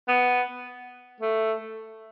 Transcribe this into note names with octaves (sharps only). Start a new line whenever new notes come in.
B3
A3